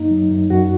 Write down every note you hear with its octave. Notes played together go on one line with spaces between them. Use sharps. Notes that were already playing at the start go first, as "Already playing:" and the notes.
Already playing: F#2 A#3 D#4
F#3
F#2
F#2 F#4